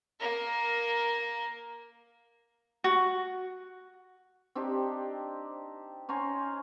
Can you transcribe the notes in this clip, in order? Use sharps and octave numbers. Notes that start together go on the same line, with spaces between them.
A#3 A#4
F#4
C4 D4 D#4 G4
C#4 C5 G#5 A#5